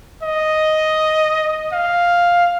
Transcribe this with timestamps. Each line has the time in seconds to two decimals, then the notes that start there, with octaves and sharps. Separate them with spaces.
0.23 D#5
1.72 F5